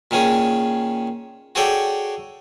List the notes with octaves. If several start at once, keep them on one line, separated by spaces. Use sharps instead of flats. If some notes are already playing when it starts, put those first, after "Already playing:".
A#2 D#3 C#4 G#4
F#4 G#4 A4 C#5 D5 G5